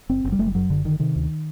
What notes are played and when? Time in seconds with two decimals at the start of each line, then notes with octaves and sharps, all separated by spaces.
0.09 F#1 C4
0.24 F#1
0.32 G3
0.39 F#1 A3
0.47 G3
0.55 F#2 F#3
0.70 F#1 D3
0.85 D3 D#3
1.00 C3 D#3
1.16 D2